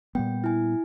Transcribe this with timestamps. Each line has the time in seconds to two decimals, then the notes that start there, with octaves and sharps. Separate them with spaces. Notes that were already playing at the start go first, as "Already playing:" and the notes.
0.15 A#2 G3 B3 G5
0.44 E4 G#5